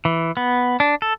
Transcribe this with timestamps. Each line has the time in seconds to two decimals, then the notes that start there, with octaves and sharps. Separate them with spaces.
0.05 E3
0.37 B3
0.80 D4
1.02 A4